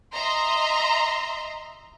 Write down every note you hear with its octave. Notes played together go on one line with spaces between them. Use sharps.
D#5 E5 A#5 C6